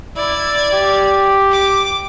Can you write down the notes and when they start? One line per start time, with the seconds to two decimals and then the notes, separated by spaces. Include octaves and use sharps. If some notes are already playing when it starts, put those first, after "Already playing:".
0.16 E4 D5 G#6
0.73 G4
1.52 D6